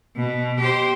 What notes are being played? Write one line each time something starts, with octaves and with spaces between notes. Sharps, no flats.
B2
G4 C5